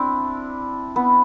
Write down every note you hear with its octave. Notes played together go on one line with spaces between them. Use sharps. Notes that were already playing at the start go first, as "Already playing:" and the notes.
Already playing: C4 D4 E4
B3